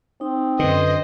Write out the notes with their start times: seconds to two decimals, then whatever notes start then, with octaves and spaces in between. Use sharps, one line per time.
0.21 C4 D#4
0.59 F#2 D3 B4 C5 D#5